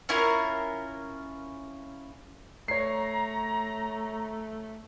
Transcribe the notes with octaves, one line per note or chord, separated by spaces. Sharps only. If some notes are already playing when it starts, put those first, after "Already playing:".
C#4 E4 F4 A#4
A3 C#5 A#5 C7